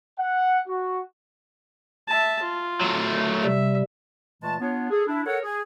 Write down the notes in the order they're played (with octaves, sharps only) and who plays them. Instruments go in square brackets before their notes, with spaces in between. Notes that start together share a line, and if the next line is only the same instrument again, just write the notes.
[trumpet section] F#5
F#4
[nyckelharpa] E5 A5
F4
[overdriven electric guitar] F#3 A3
[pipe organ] C3 G3 [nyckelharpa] E5
[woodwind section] A#2 E3 G#3 A3 A5
B3 D4 F4 C#5
G#4 A4
D4 E4
A4 A#4 C#5 F#5
G#4